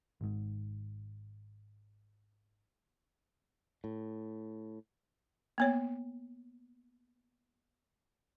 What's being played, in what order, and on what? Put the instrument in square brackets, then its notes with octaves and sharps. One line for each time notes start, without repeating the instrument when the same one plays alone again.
[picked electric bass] G#1 G#2
[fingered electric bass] A2
[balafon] A#3 B3 C#5